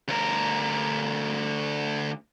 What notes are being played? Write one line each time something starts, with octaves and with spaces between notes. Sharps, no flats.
D2 A#4